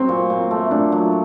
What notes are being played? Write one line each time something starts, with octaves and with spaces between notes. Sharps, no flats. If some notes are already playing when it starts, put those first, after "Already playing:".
Already playing: F#3 C4
A#2
A#2
A3
A#2 D4
F#3